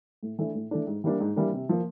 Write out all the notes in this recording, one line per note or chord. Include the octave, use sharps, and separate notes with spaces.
A2
E3 A3 D4
A2
E3 A3 D4
G#2
E3 G3 A#3 D4
G#2
E3 G3 A#3 D4
C3
F3 A#3